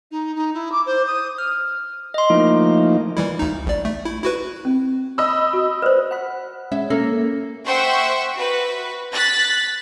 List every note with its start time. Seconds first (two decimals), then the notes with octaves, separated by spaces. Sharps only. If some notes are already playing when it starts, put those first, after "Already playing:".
0.11 D#4
0.36 D#4
0.54 E4
0.72 D6
0.86 C5
1.07 D#6
1.38 F6
2.14 D#5 C6
2.30 F3 A3 A#3 D#4 E4
3.17 E3 G3 E4
3.39 D2 D#4
3.66 A#1 D5
3.85 A3
4.05 E4
4.23 E4 F#4 B4
4.65 C4
5.18 D#5 B5 E6
5.53 F#4
5.82 B4 C5 D5
6.11 F#5 B5
6.72 G#3 C#4 E5
6.90 A#3 C#4 A4
7.65 C5 E5 F#5 G5 C6 C#6
8.35 F#4 B4
9.13 F#6 A6 B6